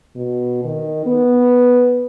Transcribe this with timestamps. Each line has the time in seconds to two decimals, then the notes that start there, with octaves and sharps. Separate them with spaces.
0.16 B2
0.64 D#3
1.06 B3